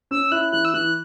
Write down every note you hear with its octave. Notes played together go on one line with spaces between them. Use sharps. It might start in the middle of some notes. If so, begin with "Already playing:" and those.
C#4 E6
E4 F#6
E3 F#6
E6
E3 F#6